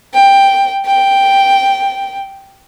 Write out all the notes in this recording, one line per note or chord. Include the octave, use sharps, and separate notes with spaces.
G5
G5